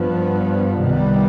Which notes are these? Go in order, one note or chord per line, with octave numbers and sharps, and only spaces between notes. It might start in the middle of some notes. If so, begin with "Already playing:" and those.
Already playing: G2 F3 B3
C2 C3 D#3 G3 B3